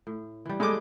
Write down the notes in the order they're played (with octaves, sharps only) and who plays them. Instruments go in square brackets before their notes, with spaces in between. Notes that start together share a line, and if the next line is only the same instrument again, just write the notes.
[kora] A2
E3 G3
[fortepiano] G#3 A3 D6 [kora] E4 G4